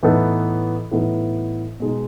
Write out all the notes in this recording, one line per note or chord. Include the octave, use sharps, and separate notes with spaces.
A2 E3 B3 D#4 A4
A2 E3 B3 D#4 A4
B2 G#3 D#4